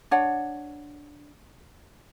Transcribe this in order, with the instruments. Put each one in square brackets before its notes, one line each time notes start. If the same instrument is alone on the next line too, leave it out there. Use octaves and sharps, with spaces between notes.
[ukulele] D4 C#5 F#5